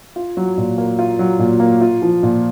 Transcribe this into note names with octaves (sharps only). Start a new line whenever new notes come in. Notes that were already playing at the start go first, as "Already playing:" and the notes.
F4
F#3
A#2
A#3
F4
F#3
A#2
A#3
F4
F3
A#2